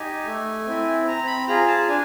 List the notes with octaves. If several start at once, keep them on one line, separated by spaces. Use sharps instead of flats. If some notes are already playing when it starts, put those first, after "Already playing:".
Already playing: D#4 G4 G#5
A3
C4 E4
C4 A#5
B5
F4 G#4 A#5
A5
D4 G#5